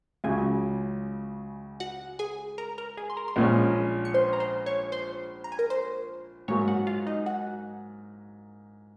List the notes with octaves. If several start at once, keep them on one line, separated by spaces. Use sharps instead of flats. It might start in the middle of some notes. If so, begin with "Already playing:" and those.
C#2 C#3 F#3 G#4 G#5
F#4 F#5
G#4 G#5
A#4 A#5
A#4 A#5
G#4 G#5
C6
A#4 A#5
C6
A#1 A#2 F3 G#3 C#4 A#4 A#5
C#6
C5 C6
A#5
C5 C6
C#5 C#6
C5 C6
A#5
G#5
A#4 A#5
C5 C6
G#2 F#3 A#3 C#5 C#6
F#4 F#5
F4 F5
D#4 D#5
F#4 F#5